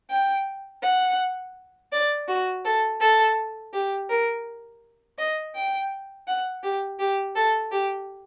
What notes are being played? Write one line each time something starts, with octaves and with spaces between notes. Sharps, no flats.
G5
F#5
D5
F#4
A4
A4
G4
A#4
D#5
G5
F#5
G4
G4
A4
G4